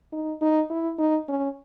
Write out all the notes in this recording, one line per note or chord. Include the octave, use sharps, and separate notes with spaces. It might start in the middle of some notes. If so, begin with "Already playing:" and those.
D#4
D#4
E4
D#4
C#4